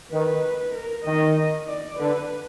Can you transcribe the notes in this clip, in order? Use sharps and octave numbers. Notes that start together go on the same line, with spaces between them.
D#3 B4
A#4
D#3 D#5
D5
D3 B4